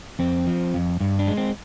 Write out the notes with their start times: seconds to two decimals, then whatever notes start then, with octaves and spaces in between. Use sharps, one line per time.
0.19 F2 C4
0.47 F3
0.74 F2
1.00 G2
1.19 D4
1.27 G#3
1.37 C4